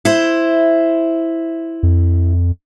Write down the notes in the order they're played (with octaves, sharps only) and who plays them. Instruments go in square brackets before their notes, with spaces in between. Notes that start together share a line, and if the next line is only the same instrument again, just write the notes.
[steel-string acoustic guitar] E4 C5
[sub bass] F2